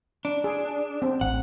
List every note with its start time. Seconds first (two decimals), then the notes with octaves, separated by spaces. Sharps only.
0.25 D4
0.44 G#4
1.02 C4
1.21 A1 F#5